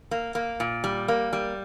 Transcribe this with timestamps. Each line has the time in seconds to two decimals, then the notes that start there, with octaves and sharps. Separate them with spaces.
0.11 A#3
0.35 A#3
0.60 A#2
0.84 G3
1.08 A#3
1.33 G3